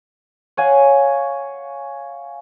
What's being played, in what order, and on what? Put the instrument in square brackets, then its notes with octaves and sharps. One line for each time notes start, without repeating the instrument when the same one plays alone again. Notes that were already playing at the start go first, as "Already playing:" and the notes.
[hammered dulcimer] C#5 F5 F#5 G#5